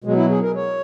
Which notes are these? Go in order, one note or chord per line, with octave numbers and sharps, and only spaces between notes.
B2 F#3 G#3
E4
G#4
A#4
C#5